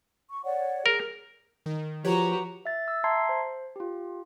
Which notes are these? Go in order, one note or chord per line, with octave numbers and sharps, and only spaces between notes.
C#6
C#5 D5 F#5
G#4 A#4
D#3
F3 F#4 G4 B4 C#5 A#5
E5 A6
E6
E5 A5 A#5 C6 G#6 C7
C5
F4 G4